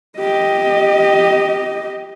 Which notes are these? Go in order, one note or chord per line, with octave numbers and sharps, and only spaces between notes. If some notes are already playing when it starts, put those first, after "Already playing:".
G4 D#5